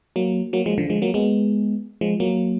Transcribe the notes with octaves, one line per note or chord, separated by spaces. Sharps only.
F#3 A#3
F#3 A#3
F3 G#3
D3 F3
F3 G#3
F#3 A#3
G#3 B3
F3 G#3
F#3 A#3